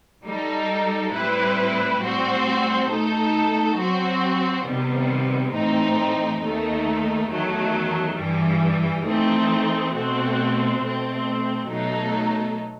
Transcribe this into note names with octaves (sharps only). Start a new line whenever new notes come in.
G3 D#4 A4
A2 G3 C4 E4 B4
A2 G3 C4 F#4 C5
B2 A3 D#4 A4
F#3 C4 F#4
C3 D#3 G3 B3
A2 E3 A3 C4 D#4
D#2 D#3 A3 D#4
E2 D#3 F#3 A3
G2 E3 G3
E3 A3 C4 D#4
B2 A3 C4 F#4
B2 A3 C4
B2 F#3 A3 D#4 A4